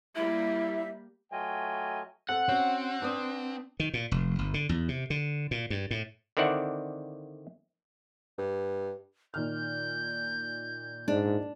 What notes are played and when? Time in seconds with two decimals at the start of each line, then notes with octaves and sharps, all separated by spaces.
0.16 G3 A#3 E4 E5
1.32 F#3 A3 F4 D#5 G5 G#5
2.29 C4 A4 F#5
2.49 C4 C#4 F#4
3.02 D4 B4 D#6
3.80 D#3
3.94 A#2
4.11 F1
4.39 G1
4.54 D3
4.69 E2
4.88 C3
5.10 D3
5.51 A#2
5.70 G2
5.91 A2
6.37 D3 D#3 C4 E4 D5 F#5
8.38 G2
9.34 A#2 D#3 F6 G6
11.08 G#2 D4